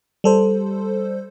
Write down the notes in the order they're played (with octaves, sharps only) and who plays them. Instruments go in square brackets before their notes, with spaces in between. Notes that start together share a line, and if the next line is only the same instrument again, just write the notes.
[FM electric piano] G3 A4 C5